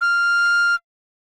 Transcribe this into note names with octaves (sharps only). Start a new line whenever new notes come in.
F6